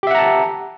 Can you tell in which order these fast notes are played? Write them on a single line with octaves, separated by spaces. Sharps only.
G4 E5 F#5 A#5 A5